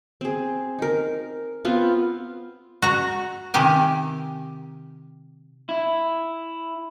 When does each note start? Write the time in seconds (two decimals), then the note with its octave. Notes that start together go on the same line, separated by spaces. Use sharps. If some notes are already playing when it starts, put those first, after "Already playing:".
0.21 C4 G#4
0.79 D#4 A#4
1.65 B3 C4 F4
2.82 F#4 A#5
3.54 C3 D#3 G4 G#5
5.69 E4